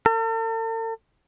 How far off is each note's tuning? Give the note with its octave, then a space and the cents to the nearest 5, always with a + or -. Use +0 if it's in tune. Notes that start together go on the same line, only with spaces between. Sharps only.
A4 +45